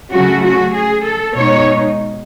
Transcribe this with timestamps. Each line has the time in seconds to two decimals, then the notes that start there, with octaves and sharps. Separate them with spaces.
0.12 C#3 F#3 A3 C#4 F#4
0.44 F#4
0.74 G#4
1.04 A4
1.35 B2 G#3 D#4 C#5